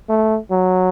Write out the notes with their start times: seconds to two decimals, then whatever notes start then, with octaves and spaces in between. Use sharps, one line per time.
0.09 A3
0.51 F#3